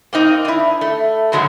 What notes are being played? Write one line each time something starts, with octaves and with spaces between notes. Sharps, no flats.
A#3 C4 D#4
D4 E4
A3
G2 D3 F#3 G#3 A3